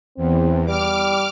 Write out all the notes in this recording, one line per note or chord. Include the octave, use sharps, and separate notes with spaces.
E2 C4
G3 D6 F6